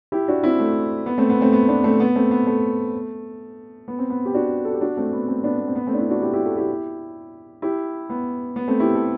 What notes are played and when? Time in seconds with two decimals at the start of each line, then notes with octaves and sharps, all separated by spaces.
0.12 E4 G4
0.28 D4 F#4
0.44 C4 E4
0.59 A3
1.06 B3
1.18 A3 C4
1.29 B3
1.41 A3 C4
1.53 B3
1.68 B3 D4
1.84 A3 C4
2.00 B3
2.16 A3 C4
2.31 B3
2.47 A3
3.88 B3
3.99 C4
4.10 B3
4.25 G4
4.34 D4 F#4
4.65 A4
4.73 G4
4.81 D4 F#4
4.97 A3 C4
5.13 B3
5.28 A3 C4
5.44 B3 D4
5.60 B3
5.68 C4
5.75 B3
5.87 A3 C4
5.94 D4
5.99 C4 E4
6.10 D4 F#4
6.22 E4 G4
6.33 E4 G4
6.45 F#4 A4
6.57 E4 G4
7.62 E4 G4
8.10 B3
8.56 B3
8.68 A3 C4
8.80 E4 G4
8.95 A4